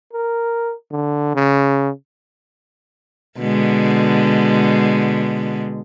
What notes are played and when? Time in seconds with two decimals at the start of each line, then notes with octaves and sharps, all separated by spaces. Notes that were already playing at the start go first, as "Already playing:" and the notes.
0.13 A#4
0.92 D3
1.35 C#3
3.38 B2 D3 G#3